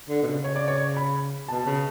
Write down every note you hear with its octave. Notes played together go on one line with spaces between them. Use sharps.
D3
B2
C#3
C#5
D5
C#5
B5
B2 A5
C#3